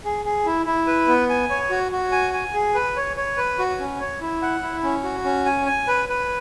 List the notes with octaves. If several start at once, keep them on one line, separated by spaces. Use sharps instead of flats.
G#4
G#4
E4
E4
B4
B3
G#5
C#5
F#4
F#4
G#5
G#5
G#4
B4
C#5
C#5
B4
F#4
C#4
C#5
E4
F#5
E4
C#4
F#4
C#4
G#5
G#5
B4
B4